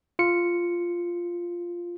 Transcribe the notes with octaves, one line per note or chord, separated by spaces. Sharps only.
F4 C#7